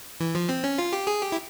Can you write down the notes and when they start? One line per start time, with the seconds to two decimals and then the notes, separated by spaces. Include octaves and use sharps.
0.20 E3
0.35 F3
0.49 C4
0.64 C#4
0.78 F4
0.93 G4
1.07 G#4
1.22 G4
1.32 E4